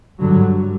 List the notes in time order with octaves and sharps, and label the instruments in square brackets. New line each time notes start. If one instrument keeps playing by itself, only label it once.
[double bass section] G2 D3 F#3